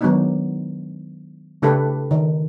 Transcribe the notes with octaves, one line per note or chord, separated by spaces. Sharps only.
D#3 F#3 G#3 B3 D4 D#4
C#3 A3 D4 G4 A4 B4
D#3